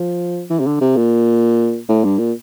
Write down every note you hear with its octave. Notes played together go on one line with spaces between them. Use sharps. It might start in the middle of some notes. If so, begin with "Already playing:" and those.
Already playing: F3
E3
C3
D3
C3
A#2
A2
G2
A#2